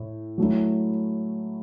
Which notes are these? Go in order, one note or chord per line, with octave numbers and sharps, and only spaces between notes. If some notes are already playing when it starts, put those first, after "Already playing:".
Already playing: A2
F#3 A3 E4